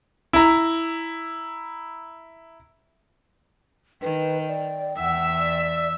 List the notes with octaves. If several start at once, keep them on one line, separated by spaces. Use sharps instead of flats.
E4 A#5
D#3 B4 G5
D5
E2 E5 F#5
D5